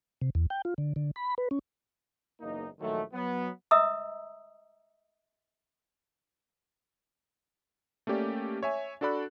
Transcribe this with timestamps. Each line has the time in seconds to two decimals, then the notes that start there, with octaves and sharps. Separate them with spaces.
0.21 C3
0.35 E2
0.50 G5
0.65 F4
0.78 D3
0.96 D3
1.16 B5
1.38 B4
1.51 C#4
2.41 F#1 E2 A#3 D#4
2.79 A#1 D#3 F#3 G#3 A3
3.13 F#3 B3
3.71 D#5 E5 A#5 D#6 E6
8.07 A3 A#3 C#4 G4 D5
8.63 C#5 E5 G#5
9.01 D4 F#4 A4 D5 B5 F#6